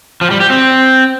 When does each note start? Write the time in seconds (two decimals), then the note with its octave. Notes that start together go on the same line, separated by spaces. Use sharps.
0.21 F3
0.31 G3
0.40 G4
0.50 C4